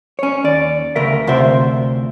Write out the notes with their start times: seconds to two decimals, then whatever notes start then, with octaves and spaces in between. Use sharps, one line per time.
0.19 C#4 C#5
0.44 D#2 D5
0.96 D2 C#3 A#4 E5
1.27 D2 C3 F4 C5 E5